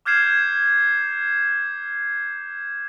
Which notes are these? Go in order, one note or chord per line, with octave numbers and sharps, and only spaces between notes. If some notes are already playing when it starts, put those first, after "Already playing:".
D6 F6 G6 G#6 C7 E7